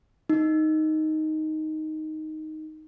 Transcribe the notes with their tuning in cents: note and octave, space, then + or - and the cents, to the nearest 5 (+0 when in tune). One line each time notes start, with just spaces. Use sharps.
D#4 +0